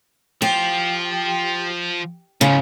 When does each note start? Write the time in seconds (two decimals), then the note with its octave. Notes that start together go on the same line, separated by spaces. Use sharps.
0.42 F3 F4 G4
2.41 G#2 C#3 F3